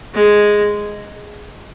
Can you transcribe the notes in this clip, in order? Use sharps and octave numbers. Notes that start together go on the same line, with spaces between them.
G#3